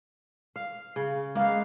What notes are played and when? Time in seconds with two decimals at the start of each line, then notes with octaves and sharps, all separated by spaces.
0.56 F5
0.96 C#3
1.35 G#3 A#3 B3 F5